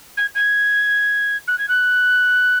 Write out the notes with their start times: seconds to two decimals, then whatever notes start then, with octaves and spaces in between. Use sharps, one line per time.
0.17 G#6
0.35 G#6
1.47 F#6
1.58 G#6
1.68 F#6